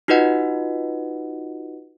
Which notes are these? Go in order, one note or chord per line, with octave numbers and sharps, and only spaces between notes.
D#4 F4 F#4 B4 D#5 F#5